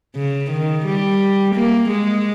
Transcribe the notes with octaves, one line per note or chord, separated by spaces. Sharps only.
C#3
D#3
G3
A#3
G#3